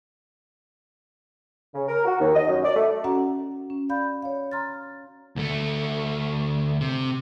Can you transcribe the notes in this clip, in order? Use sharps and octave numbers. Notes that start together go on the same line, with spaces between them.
C#3
A#4
F#4
D#2
D#5
F#2
D5
A3
C#4 F#4 F#5 A#5
C#4
D5 F5 B5 G6
C#5 F5
A#5 C6 F6 A6
D2 A3
C3